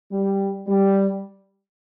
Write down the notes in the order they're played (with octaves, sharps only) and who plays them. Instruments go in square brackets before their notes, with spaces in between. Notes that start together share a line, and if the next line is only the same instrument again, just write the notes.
[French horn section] G3
G3